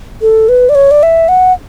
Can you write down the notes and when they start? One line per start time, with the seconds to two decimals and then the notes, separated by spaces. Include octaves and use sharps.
0.22 A4
0.49 B4
0.69 D5
0.75 C#5
0.91 D5
1.03 E5
1.29 F#5